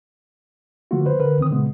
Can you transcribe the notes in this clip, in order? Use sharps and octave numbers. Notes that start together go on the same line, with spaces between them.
D3 F3 A3 A#3 F4 F#4
B4 C5
D3 A#4 B4
C#2 D#3 C4 D#6
A#2 C#3 G#3 B3